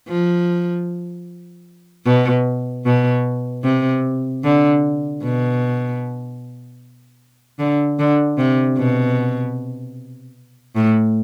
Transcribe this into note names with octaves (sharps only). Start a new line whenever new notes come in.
F3
B2
B2
C3
D3
B2
D3
D3
C3
B2
A2